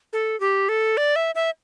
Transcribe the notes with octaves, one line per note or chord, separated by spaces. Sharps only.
A4
G4
A4
D5
E5
E5